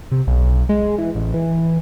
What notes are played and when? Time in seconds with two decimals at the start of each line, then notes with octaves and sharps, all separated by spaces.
0.11 C3
0.27 B1
0.69 G#3
0.98 E3
1.15 A1
1.34 E3